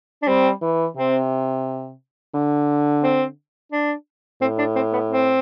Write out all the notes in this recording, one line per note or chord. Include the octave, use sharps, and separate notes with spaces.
D4
G3 C4
E3
C3 C4
D3
C4
D4
A2 C4
D4
C4
B3
C4